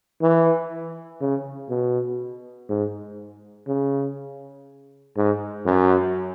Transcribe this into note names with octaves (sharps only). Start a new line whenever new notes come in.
E3
C#3
B2
G#2
C#3
G#2
F#2